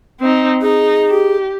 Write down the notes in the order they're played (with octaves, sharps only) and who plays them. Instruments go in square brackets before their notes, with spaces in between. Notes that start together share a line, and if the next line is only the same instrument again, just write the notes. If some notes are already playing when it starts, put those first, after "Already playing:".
[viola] C4 D#4
[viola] D#4 [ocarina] G#4
[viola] G4